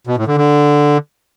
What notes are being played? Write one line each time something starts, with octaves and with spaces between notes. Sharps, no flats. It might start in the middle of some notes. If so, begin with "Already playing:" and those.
B2
A2
D3
D3